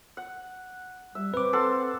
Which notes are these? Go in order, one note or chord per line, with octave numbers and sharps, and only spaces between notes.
F#5
G3 E5
C4 B4 D6
A4 F#5 C6